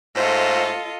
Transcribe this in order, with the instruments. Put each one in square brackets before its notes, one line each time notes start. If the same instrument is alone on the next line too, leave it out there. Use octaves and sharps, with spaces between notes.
[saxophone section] G#2 A3 C5 [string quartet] F4 A4 D#5